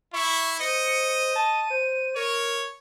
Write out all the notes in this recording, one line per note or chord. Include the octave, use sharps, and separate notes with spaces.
E4 E5 C#6
C5 D#5 C#7
D#7
A5
C5
A#4 C#5